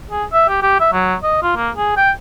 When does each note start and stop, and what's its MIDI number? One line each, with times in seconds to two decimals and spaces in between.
0.11 0.24 68
0.33 0.49 76
0.49 0.62 67
0.62 0.80 67
0.80 0.92 76
0.93 1.15 54
1.23 1.40 75
1.43 1.55 65
1.56 1.70 58
1.76 1.96 68
1.97 2.11 79